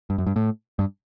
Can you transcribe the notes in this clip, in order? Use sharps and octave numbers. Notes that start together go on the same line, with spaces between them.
G2
F#2
G2
A2
G2